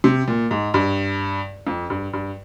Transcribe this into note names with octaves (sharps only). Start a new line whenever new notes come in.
C3
A#2
G#2
G2
F2
G2
G2